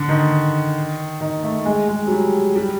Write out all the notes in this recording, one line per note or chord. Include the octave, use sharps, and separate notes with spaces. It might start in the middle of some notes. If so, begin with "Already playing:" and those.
Already playing: D3
D#3
D#3
A3
G#3
G#3
F#3
G3
G3